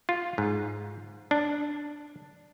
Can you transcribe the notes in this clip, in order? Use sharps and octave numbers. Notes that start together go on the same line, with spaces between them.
F4
G#2
D4